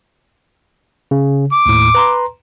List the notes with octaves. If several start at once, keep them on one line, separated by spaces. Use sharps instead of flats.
C#3
D6
D#2 A2
B4 A#5 C6